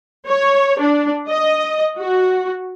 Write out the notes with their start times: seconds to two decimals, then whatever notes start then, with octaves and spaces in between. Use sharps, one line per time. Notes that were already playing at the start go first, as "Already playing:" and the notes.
0.26 C#5
0.80 D4
1.27 D#5
1.97 F#4